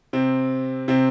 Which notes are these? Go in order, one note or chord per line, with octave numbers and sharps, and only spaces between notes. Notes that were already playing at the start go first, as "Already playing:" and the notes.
C3 C4
C3 C4